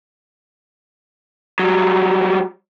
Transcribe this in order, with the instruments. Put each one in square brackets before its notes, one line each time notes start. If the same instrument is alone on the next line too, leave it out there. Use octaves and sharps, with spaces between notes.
[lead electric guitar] F#3 G3